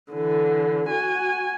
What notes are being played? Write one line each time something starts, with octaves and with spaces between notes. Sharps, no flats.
D3 E3
F#4 G#5